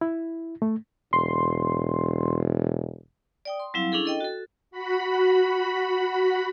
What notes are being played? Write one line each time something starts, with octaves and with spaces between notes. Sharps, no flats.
E4
A3
E1 C6
D5 G5 D#6
C6
F#3 G3 C4 E4 F5
C#4 D4 E4 G#4 A4
A4 D#5 G5
F#4 A4
F#4 B5